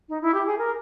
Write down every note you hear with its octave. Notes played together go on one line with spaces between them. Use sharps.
D#4
E4
G4
G#4
A#4